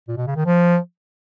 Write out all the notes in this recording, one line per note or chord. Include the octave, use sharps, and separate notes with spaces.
A#2
B2
C#3
D#3
F3